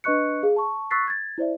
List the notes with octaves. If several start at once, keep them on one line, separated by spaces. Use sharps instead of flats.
D4 B4 D#5 C#6 F#6 C#7
G#4 F5
A5 C#6
C#6 E6 F#6 A6 B6 C7
G#6 A6
E4 C5 D5 E5